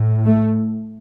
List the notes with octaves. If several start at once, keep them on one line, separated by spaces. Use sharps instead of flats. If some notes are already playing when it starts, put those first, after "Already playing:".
Already playing: A2
A3